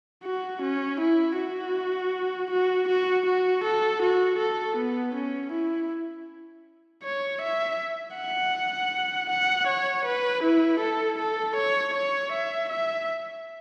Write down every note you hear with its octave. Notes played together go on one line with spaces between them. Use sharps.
F#4
C#4
E4
F#4
F#4
F#4
F#4
A4
F#4
A4
B3
C#4
E4
C#5
E5
F#5
F#5
C#5
B4
E4
A4
A4
C#5
C#5
E5
E5